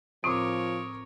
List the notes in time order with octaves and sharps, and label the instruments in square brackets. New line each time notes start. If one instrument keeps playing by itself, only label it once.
[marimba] A2 C4 [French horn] F3 [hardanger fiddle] A#4 C#5 [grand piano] D6 D#6